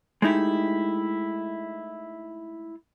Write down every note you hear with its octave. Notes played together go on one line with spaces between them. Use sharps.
G#3 A3 D#4 E4 G4